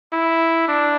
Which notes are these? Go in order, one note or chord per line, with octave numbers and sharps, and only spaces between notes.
E4
D4